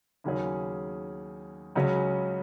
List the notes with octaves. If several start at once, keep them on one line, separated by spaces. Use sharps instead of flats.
D#2 C#3 F#3 C#4 G#4
C#2 C#3 F#3 C#4